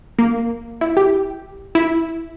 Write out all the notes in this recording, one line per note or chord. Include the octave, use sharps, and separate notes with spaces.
A#3
E4
G4
E4